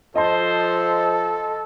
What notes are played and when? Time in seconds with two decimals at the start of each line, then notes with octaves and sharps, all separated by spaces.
0.16 F3 A4 C5 D#5 A5 C6